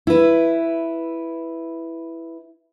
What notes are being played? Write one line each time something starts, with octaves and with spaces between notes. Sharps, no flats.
E4 B4